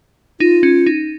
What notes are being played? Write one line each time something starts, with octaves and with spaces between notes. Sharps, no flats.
D#4 F4
C#4
D#4